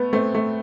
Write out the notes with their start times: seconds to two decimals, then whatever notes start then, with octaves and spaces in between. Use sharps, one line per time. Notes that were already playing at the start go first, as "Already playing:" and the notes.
Already playing: A3 B3
0.13 A3 C4
0.35 A3